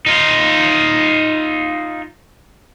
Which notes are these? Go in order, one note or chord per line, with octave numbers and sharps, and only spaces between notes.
D#4 F4